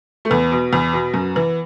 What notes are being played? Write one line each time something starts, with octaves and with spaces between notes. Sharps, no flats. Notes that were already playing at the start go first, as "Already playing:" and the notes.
A3
E2 B3
B2
E2
B2
F#2
E3